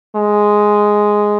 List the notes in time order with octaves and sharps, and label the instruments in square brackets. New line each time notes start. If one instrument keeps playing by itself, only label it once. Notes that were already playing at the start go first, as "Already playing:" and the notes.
[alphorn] G#3